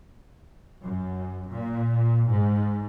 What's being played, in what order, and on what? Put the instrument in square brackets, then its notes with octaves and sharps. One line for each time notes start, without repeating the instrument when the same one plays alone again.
[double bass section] F#2
A#2
G#2